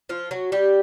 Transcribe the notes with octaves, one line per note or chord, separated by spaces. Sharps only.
F3 F4
F#3 F#4
G3 G4